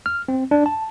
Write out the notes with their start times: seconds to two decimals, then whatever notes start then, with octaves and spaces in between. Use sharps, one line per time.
0.06 F6
0.28 C4
0.51 D4
0.66 A5